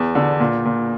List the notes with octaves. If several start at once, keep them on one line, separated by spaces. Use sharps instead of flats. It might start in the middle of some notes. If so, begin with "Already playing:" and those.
Already playing: E2
D3
A#2
A#2